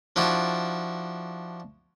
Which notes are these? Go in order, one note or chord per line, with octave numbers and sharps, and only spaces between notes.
F3 D4 E4 F#4